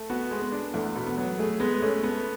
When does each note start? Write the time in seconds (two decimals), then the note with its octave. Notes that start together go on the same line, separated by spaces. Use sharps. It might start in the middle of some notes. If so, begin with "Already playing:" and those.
Already playing: A3
0.10 B3 F#4
0.31 G#3
0.42 B3
0.52 D4
0.74 E2 A3
0.95 B2
1.06 B3
1.18 F#3
1.39 A3 G#4
1.60 G#3 B3
1.82 A3 C#4
2.03 A3 B3